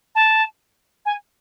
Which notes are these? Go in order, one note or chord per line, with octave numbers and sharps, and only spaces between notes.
A5
G#5